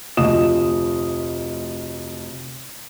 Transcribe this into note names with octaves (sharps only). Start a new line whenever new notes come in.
F1 D2 F3 D#5 D#6 E7